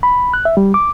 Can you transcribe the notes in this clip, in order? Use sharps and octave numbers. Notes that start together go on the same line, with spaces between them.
B5
F#6
E5
G3
D6